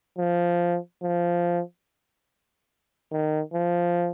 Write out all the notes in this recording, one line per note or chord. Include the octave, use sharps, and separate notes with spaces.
F3
F3
D#3
F3